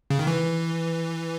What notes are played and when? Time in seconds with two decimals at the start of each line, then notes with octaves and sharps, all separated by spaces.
0.10 C#3
0.19 D#3
0.27 E3